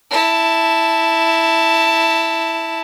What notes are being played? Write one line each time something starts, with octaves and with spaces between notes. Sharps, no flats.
E4 A5